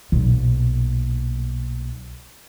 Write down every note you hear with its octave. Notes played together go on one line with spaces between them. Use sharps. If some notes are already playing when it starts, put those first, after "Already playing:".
B1 A#2